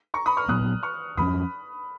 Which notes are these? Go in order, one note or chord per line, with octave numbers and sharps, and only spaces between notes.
A#5 C#6
B5 D#6
C#6 F6
A#2 F#3 B3 D#6 F#6
C#6 F6
F2 F3 A#3 C#4 B5 D#6